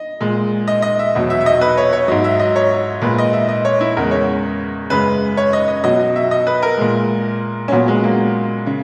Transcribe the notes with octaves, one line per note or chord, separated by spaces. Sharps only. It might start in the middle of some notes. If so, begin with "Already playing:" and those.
Already playing: D#5
A#2 G#3
D#5
D#5
E5
E2 B2 F#3
E5
E5
D#5
B4
C#5
C#5
G#2 F#3 D#5
E5
D#5
C#5
A#2 G#3 B4
D#5
E5
D#5
C#5
E4
E2 C#3 G#3 A#4
C#5
F#2 C#3 G#3 B4
C#5
D#5
D#5
B2 F#3 D#5
D#5
E5
D#5
B4
A#4
A#2 G#3
C#4
A#2 F#3 B3
G#3
A#3
C#3